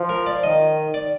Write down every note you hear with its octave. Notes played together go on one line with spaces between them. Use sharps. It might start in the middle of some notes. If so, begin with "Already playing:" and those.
Already playing: F3
A#4
D5
D#3 D#5
D5